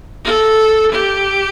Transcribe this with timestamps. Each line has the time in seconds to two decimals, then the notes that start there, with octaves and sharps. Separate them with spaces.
0.24 A4
0.92 G4